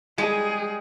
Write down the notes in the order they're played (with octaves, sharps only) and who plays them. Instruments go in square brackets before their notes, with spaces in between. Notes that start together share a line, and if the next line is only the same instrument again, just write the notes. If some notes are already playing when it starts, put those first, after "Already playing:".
[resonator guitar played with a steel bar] G3 G#3 [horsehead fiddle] G#4